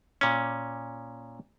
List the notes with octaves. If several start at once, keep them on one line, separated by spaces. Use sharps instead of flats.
A#2 C#4